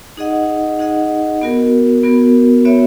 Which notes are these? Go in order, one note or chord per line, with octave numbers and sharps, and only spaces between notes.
D#4 G#4 D#5 F#5
D#4 G#4 D#5 F#5
B3 F#4 A#4
B3 F#4 A#4
B3 F#4 C#5 E5